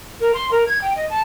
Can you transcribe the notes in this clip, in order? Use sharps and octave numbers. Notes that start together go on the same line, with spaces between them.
A#4
C6
A#4
G#6
G5
D#5
A5